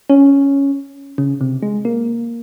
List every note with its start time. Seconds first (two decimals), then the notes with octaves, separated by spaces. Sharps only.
0.10 C#4
1.18 C#3
1.41 C3
1.62 G#3
1.85 A#3